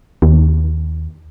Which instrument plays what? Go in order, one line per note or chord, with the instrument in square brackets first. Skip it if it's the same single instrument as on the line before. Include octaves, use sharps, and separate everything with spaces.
[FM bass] D#2